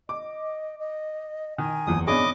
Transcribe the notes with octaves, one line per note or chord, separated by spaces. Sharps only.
D#5 D6
D#5
D#3 G#5
F#1 E2 D#6
G#1 E2 D4 G#4 C#5 D#5 B5 D6